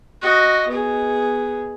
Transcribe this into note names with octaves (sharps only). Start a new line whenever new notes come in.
F#4 D#5
B3 G#4